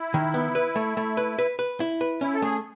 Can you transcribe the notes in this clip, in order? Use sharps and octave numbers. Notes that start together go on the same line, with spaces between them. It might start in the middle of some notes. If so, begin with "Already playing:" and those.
Already playing: E4
D#3
B3
B4
A3
A3
B4
B4
B4
E4
B4
C#4 E4
A4
A3 G#4